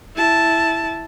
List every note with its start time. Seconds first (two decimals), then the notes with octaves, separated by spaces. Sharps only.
0.16 E4 A5